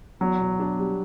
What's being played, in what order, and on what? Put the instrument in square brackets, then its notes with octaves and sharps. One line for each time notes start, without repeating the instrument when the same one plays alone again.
[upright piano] E2 [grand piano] F#3
[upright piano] B2
D4
G3